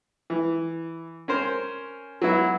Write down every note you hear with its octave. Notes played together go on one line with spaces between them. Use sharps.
E3
C#4 A#4 C5
F#3 B3 E4